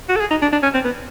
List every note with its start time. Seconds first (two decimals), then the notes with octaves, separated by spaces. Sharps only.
0.09 F#4
0.16 A4
0.20 G#4
0.30 D#4
0.42 D4
0.52 D4
0.63 C#4
0.74 C4
0.85 B3